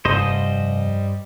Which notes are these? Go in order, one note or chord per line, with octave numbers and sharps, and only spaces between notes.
F1 G2 G3 C5 D#5